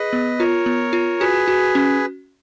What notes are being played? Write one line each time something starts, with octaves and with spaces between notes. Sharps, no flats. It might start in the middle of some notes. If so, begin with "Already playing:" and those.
Already playing: G#4 B4 D#5
B3
F4 A#4 C#5
B3
F4
F#4 G#4 B4
F#4
C#4